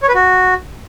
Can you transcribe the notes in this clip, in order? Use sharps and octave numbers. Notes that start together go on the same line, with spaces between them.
C#5
B4
F#4